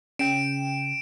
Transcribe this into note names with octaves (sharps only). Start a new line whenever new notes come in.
C#3 G5 D7 E7